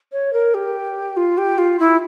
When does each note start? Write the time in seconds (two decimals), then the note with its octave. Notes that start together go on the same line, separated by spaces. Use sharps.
0.12 C#5
0.33 A#4
0.54 G4
1.17 F4
1.38 G4
1.58 F4
1.80 E4